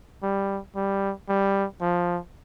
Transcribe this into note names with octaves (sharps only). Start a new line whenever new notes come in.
G3
G3
G3
F3